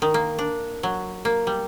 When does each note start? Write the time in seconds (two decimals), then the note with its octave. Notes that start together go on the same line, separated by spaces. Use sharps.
0.02 D#3
0.14 A#3
0.39 D4
0.83 F#3
1.25 A#3
1.47 G3